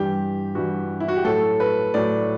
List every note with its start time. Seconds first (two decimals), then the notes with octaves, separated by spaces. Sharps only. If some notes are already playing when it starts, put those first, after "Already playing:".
Already playing: G2 E3 G3 G4
0.55 G2 E3 G3 F#4
1.00 E4
1.08 F#4
1.17 G4
1.24 A2 F#3 A4
1.60 B4
1.94 A2 F#3 D5